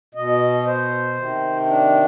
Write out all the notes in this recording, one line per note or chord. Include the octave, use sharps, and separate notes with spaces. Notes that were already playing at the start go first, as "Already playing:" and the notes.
B2 D#5
C5
C3 D#3
D4